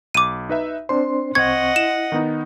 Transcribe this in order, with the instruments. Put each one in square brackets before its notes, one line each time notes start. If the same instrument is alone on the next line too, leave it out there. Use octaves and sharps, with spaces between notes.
[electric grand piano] B1 [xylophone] D6 D#7
[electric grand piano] D#4 B4 E5
[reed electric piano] C4 D4 C5 [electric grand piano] C6
[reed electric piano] C2 C4 C#6 [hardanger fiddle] D#5 F#5 [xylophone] G#6
[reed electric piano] E4 [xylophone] E7
[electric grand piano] D#3 B3 D#4